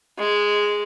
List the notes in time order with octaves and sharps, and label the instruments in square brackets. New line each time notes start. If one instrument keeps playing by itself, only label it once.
[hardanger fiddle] G#3